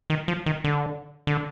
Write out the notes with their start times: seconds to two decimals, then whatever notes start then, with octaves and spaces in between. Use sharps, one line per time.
0.10 D#3
0.28 F3
0.46 D#3
0.64 D3
1.27 D3